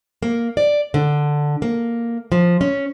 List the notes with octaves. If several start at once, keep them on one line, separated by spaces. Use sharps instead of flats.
A#3
D5
D3
A#3
F3
C#4